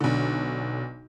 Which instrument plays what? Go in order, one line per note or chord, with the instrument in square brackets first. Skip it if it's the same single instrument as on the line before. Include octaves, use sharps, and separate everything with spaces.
[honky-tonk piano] B1 D3